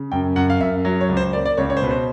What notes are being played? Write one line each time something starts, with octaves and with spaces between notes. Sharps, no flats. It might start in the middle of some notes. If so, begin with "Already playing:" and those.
Already playing: C#3
F#2 G5
F#2 F#5
F5
F#2 E5
F#3
C#5
C#2
C5
A#3 D5
D5
C#2 C#5
C#5
C5
B2 B4
C5